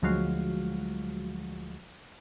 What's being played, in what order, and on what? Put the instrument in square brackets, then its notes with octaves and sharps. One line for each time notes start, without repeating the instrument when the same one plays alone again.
[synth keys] D2 F3 F#3 G#3 F#4 F5